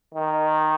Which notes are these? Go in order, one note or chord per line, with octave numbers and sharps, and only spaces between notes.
D#3